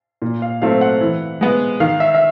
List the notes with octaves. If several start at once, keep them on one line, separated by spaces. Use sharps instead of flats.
A#2
F5
F#3 A3 C4 F5
F#5
E3
G#3 B3
D#3 F5
E5
E5